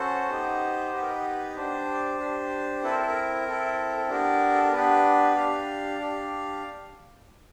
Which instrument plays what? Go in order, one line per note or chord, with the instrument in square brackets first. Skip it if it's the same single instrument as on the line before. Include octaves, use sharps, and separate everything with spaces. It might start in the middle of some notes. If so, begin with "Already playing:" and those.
Already playing: [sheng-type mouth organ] C#4 F#4 A4 C5
B3 D#4 G4
B3 D#4 G4 B4
A#4
B4
D4 G4 C5
D4 G4
C4 E4 A4 B4
A#4
A4
A#4
C4 E4 A4
A4
B3 D4 G4 A#4
A4
A#4
B3 D4 G4 B4
D4 G4 F5
D4 G4